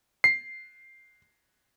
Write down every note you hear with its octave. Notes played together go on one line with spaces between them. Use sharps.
C7